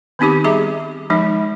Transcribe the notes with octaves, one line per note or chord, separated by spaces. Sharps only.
D#3 B3 C4 D#4 G4 D6
G3 G#4 E5 A#5 D6
F3 G#3 D#4